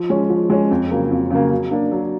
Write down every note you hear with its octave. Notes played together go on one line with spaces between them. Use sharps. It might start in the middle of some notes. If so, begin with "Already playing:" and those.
Already playing: F3
G#3 C#4
F3
G#3 C#4
F2
C#3 F#3 A#3
F2
C#3 F#3 A#3
F#3
A#3 D4
F#3